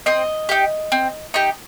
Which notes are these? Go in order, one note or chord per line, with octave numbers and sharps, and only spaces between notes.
C4 D#5
D#4 G4
C4
D#4 G4